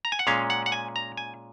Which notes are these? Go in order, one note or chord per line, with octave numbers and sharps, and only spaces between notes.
A#5
G#5
F#5
A#2 G#3 C#4 F5
F#5
F#5
G#5
A#5
G#5